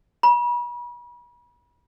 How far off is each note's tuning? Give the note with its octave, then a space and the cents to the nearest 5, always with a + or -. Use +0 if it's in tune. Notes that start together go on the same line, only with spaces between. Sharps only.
B5 -40